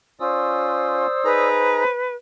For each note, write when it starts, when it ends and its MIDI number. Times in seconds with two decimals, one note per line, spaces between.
0.20 1.07 61
0.20 1.07 65
0.20 1.91 72
0.20 1.49 74
0.20 1.49 87
0.20 1.49 88
1.25 1.84 63
1.25 1.84 68
1.25 2.15 71
1.25 1.84 82